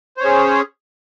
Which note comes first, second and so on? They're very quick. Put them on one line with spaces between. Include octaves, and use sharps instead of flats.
C5 C#5 C#4 G#4